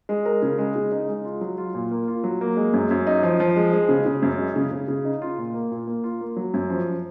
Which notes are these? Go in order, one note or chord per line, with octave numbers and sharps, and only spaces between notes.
G#3
A#4
C#3
G#3
C#3
D#4
G#3
F4
F#3
F4
A#2
A#3
F4
F#3
A#3
G#3
F#2
F#2
D#4
F3
F3
G#3
G#3
C#3
C#3
F#2
G#3
C#3
C#3
C#3
D#4
F4
A#2
A#3
A#2
A#3
F4
A#3
F#3
F#2
F3